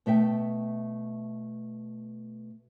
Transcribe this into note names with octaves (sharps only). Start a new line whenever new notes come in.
B2 A3 E5 G5